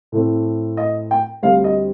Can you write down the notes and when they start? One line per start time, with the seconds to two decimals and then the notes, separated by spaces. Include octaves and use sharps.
0.12 A2 A3 C4
0.77 D#5
1.11 G5
1.42 D2 D3 G3 C4 F5
1.64 D#5